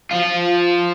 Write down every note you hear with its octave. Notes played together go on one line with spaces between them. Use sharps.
F3 F4